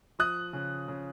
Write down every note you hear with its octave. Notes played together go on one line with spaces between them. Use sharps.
F3 D#6 F#6
C#3
C#3